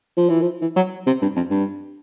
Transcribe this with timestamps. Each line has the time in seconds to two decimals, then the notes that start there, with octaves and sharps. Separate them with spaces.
0.17 F3
0.30 E3
0.42 F3
0.62 E3
0.76 F#3
1.07 C3
1.22 G2
1.36 F2
1.51 G2